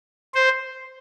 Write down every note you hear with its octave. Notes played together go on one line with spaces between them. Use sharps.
C5